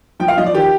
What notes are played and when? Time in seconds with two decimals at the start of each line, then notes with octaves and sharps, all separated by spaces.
0.20 F3 G5
0.28 F5
0.37 F3 D#5
0.46 D5
0.54 D#3 G4